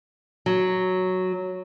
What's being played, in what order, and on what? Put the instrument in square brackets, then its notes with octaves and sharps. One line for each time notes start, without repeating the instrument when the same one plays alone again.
[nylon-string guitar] F#3